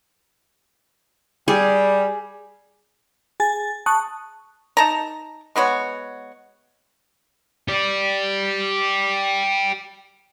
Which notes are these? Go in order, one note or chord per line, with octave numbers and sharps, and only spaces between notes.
G3 G#4
G#4 G#5 A6
A5 C#6 D#6 F#6
D#4 A5 A#5
G#3 B3 F#4 C#5
G4 D5